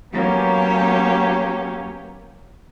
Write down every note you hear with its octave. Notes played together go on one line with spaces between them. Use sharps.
F#3 A#3 B3 C#4 G4 C#5